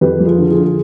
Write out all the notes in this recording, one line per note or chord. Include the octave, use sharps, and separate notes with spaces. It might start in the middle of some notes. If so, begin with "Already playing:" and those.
F2 G4 B4
F3
F4 G#4
D3
F4 G#4
D3
G#4